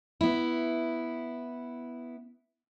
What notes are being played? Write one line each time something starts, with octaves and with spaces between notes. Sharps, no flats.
B3 E4